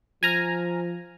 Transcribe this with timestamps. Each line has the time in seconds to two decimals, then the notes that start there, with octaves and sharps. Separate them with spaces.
0.23 F3 G#5 A#5 F6